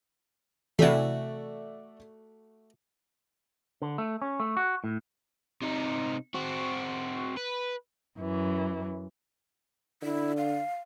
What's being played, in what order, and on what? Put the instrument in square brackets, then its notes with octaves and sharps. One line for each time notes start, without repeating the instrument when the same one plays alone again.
[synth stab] C3 E3 [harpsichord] A3 F#4 [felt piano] A4 D5 E5
[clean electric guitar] D3
A3
C#4
A3
F#4
A2
[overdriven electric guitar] C3 D#4
C4 F#4
B4
[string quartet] F#2 E3
[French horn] D3 [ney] E4
[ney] F5